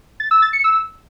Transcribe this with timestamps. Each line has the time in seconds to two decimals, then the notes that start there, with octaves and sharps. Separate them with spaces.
0.20 A6
0.31 E6
0.42 A6
0.53 C#7
0.64 E6